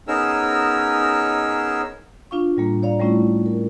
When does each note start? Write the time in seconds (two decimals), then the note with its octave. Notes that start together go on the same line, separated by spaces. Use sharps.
0.08 B3 C#4 D#4 G#4 A#4 E6
2.31 D4 F4 F5 C#6
2.57 A2 G3 A#3
2.83 C#5 D5 F5 A#5
2.99 G3 A3 C#4 E4 F4
3.46 A#4